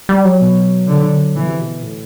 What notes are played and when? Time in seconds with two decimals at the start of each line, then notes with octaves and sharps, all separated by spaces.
0.09 G3
0.25 F#3
0.41 B2
0.88 D3
1.36 B2 E3
1.48 C3
1.60 B2
1.83 A2